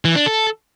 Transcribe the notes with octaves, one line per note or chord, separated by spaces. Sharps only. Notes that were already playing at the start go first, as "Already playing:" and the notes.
E3
D4
A4